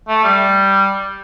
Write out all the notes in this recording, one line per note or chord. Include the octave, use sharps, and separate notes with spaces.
A3
G3